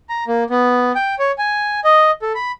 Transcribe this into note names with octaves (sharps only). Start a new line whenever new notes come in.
A#5
A#3
B3
G5
C#5
G#5
D#5
A4
B5